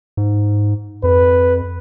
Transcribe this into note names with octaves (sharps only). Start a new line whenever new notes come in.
G#2
F2 B4